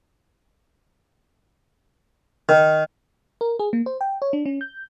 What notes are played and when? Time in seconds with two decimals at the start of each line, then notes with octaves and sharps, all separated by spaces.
2.49 D#3
3.41 A#4
3.59 G#4
3.73 A#3
3.86 C5
4.01 G5
4.22 C#5
4.33 D4
4.45 C#4
4.61 G6